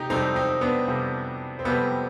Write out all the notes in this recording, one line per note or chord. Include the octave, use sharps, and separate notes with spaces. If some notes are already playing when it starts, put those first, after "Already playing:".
Already playing: C3 D#4 G4
F2 C3 G3 C4 D#4
C4 D#4
B3 D4
F2 C3 G3
C4
F2 C3 G3 B3